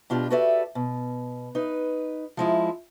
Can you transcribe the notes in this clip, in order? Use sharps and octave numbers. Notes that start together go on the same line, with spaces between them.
B2 D4 F4 G4
F#4 G4 A4 B4 D5 E5
B2
D#4 B4
F3 G#3 E4